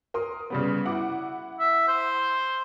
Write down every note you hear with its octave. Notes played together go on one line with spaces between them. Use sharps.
A#4 C6 D#6
C#3 G3 B3
E4 F#5 D6
E5
C5